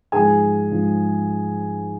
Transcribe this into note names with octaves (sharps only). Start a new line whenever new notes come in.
G#2 F3 G#4 G#5
G#2 F3